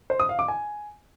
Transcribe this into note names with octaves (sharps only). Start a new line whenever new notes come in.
C5
D#6
F5
D6
G#5